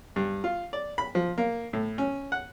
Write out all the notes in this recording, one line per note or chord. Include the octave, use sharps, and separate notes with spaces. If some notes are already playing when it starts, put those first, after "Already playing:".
G2
F4
D5
B5
F3
A#3
A2
C#4
F#5